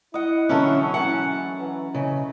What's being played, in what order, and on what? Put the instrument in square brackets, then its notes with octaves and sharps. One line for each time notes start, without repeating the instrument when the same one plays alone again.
[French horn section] E4 [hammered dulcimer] D#5 F#5
[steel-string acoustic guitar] D3 C#4 [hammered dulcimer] E3 F#3 A3
[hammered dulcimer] C#4 A5 [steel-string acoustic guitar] F#5
[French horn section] E3
[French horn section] E2 D#5 [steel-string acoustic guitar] C#3